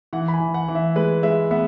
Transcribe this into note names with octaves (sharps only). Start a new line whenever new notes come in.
E3 F#5
B5
G#5
E3
F#5
E3
E5
G#3 B4
G#3 E5
B3 E5